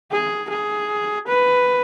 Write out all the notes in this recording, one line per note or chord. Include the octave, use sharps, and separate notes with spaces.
G#4
G#4
B4